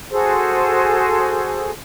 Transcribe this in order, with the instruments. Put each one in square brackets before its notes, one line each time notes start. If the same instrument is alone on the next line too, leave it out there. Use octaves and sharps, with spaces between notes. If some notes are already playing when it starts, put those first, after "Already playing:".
[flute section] F#4 G#4 A4 C5